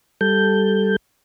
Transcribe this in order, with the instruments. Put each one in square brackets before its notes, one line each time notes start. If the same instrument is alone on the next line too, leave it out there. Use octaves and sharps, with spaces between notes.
[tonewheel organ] G3 A4 G6